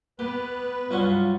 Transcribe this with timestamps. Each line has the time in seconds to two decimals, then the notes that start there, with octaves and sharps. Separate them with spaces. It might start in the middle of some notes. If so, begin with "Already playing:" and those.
0.19 B3 G4 B4
0.91 C2 G2 F#3 C#4 F4